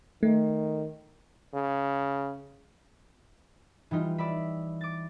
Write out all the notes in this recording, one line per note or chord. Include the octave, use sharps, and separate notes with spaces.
D#3 A3
C#3
E3 G3 D#4 F4
D5 E5 B5
D6 A6